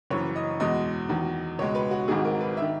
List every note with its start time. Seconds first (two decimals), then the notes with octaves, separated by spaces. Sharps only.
0.11 F#1 F#2 E3 C#5
0.36 D#5
0.60 E2 B2 G#3 D#5
1.09 E2 D#3 F#3
1.58 C#2 B2 G#3 C#5
1.75 B4
1.91 F#4
2.08 G#1 G#2 D#3 F#3 G#4
2.25 A#4
2.40 B4
2.57 D#3 E5